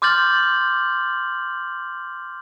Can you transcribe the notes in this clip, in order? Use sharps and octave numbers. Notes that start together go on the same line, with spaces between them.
C6 D6 F6 G6 A6 F#7